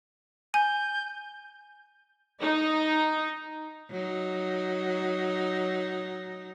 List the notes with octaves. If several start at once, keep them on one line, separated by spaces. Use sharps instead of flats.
G#5 G6
D#4
F#3 D#4